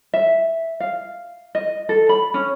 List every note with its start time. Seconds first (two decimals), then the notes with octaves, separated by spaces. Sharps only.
0.14 E5
0.80 F5
1.55 D#5
1.89 A4
2.09 B5
2.34 C#4